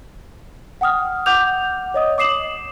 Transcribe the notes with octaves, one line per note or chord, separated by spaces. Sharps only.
F#5 G5 D#6 F6
F#5 D6 G6 F7
C#5 D#5 D#6
D6 D#6 C7 E7 F#7